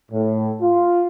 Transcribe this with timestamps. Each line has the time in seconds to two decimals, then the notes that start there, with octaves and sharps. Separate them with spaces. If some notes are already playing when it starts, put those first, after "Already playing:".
0.12 A2
0.62 F4